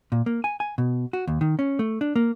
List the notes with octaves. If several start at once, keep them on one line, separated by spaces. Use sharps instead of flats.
A#2
A#3
G#5
G#5
B2
F#4
D#2
D#3
C#4
A3
D4
A#3